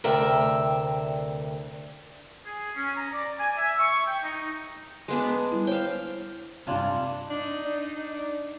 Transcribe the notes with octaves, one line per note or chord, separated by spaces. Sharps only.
D2 C3 A#4 D5 E5 G5
G#4
C#4
A#5
D5
G#5
E5
C#6
G5
D#4
G#3 B3 D4
G3 E4
C5 C#5 F5 G5
G2 C3 D4 F4 G#5
D4 D#4
D4